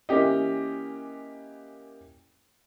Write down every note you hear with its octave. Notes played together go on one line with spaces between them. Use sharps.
E3 A#3 C#4 G4 D#5